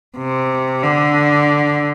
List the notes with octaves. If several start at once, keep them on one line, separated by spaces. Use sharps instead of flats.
C3
D3